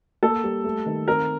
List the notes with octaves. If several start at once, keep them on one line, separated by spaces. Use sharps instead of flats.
A#3 A4
G3
A3
D#3
C4 A#4